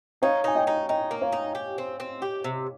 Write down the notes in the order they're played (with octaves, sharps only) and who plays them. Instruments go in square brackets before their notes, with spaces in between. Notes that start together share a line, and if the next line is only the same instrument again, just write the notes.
[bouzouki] D#4 [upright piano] C#5 F5
[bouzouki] D#4 [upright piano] G#5
[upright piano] D#5 G5
[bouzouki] D#4
[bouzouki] D#4 [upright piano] D#5 G5
[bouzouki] A#3
[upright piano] C#5 F5
[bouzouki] D#4
G4
C4
C4
G4
C3